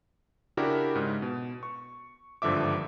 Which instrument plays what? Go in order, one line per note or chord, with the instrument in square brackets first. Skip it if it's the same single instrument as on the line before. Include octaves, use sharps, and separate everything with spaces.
[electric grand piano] C#3 D4 E4 F#4 G4 A#4
G#2 C#3
B2
C#6
G#1 G2 D3 F3 E5 D6